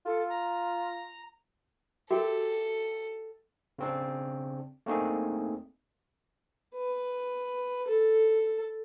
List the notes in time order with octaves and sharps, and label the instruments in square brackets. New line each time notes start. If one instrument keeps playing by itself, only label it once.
[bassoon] F4 [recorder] A4
[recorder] A#5
[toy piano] F#4 A#4 G5 [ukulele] G4 E5 [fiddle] A4
[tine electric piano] C#3 C4 D4
A3 A#3 C4 D4 D#4 G#4
[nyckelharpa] B4
A4